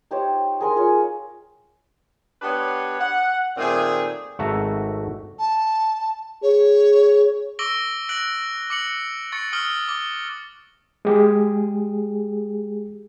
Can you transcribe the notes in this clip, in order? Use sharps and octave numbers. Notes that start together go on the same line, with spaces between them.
D#4 G4 C5 C#5
G#4 A#4 C6
F4 G#4 C#5
B3 D4 G4 B4 C#5
F#5
A#2 D#3 A3 C4 G#4
G#1 A3 F#4 E5 A#5
A5
G#4 C#5
C#6 D6 E6 A#6 D7 G7
F#6 A#6 D7 F#7
D6 C#7 F#7
C#6 A6 C#7
C#6 D#6 F6 G7
D6 G7
G#3 G4 G#4